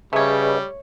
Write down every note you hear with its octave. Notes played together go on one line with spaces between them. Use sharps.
C#3 G3 A3 G#4 B4 C#5 D#5